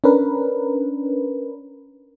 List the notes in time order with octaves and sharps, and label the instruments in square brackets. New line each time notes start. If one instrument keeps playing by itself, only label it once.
[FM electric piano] C#4 D4 A#4 B4